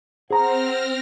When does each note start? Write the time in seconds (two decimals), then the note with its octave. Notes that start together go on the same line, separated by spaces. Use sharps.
0.31 C4 G#4 C5 F#5 A#5 F6 A#6